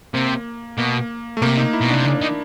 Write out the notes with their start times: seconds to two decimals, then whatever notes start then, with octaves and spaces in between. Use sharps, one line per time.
0.14 C3 A#3
0.78 B2 A#3
1.37 A3
1.42 C3 A#3
1.57 D#4
1.73 E4
1.81 B2
1.90 C3 D4
2.05 C#3 D4
2.21 D#3